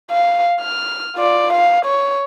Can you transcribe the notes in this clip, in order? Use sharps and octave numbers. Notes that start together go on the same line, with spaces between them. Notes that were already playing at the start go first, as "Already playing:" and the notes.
F5
F6
F4 D5
F5
C#5